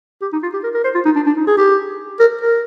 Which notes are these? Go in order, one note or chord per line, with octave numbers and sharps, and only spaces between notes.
G4
D#4
F4
G4
A#4
A#4
C5
F4
D#4
D4
D4
D#4
G#4
G4
A#4
A#4